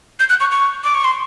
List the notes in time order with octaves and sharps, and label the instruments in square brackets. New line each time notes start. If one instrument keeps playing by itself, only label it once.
[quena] G6
F#6
C#6
C#6
D6
C#6
C6